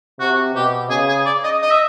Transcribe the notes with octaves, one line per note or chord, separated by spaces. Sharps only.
C3 F#4
B2 G4
C#3 G#4
G#4
D5
D#5
D#5
E5